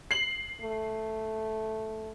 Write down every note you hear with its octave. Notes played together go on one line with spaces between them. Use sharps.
C7 F#7
A3